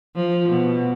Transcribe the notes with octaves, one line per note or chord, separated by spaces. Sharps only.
F3
B2